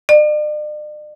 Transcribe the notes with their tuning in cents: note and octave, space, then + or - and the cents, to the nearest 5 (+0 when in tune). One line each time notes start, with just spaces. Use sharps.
D5 +45